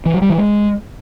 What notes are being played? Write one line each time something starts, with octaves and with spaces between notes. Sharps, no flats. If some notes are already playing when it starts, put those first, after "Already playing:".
E3
F#3
G3
E3
G#3